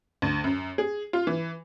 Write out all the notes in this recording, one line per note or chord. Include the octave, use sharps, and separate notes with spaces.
D2
F#2
G#4
F4
E3